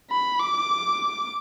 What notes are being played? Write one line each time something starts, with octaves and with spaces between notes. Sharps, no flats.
B5
D6